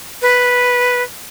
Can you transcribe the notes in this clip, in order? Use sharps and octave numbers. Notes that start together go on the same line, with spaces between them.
B4